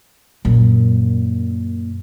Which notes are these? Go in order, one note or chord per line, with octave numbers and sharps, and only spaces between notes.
F#2 A#2